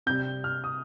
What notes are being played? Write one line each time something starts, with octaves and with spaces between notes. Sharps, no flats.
C3 G3 G6
F6
D#6